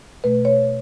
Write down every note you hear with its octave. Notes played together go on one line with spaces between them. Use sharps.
B2 A3 B4
C#5